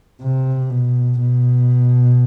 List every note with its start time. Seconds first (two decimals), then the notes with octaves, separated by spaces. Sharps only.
0.21 C3
0.70 B2
1.20 B2